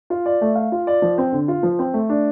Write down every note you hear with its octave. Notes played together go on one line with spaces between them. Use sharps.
F4
D5
A3
F5
F4
D5
F3
C4
D3
F4
F3
C4
A3
D4